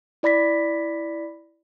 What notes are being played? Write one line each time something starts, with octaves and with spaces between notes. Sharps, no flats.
E4 D5 B5 A#6 B6